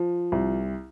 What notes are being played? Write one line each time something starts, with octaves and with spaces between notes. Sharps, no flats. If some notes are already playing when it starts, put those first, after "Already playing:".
Already playing: F3
C2